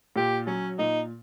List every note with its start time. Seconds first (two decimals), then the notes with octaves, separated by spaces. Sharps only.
0.16 A#2 G4
0.47 F#3 C#4
0.79 A#2 D#4